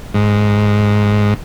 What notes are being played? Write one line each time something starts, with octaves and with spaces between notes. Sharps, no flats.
G#2